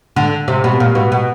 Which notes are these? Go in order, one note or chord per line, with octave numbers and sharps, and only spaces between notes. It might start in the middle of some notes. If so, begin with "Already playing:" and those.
D3
C3
B2
A#2
B2
B2